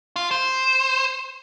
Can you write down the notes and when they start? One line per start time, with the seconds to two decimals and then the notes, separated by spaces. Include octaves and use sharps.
0.16 F4
0.31 C5